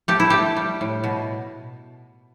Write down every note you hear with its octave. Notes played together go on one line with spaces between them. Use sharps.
A3 G4
E4
A3 G4
G3
A2
B2